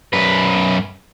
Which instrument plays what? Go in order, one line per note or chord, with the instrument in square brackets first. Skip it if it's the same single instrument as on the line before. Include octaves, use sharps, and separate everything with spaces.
[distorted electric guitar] F#2 B4